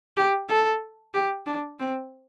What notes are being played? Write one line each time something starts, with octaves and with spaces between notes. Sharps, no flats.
G4
A4
G4
D4
C4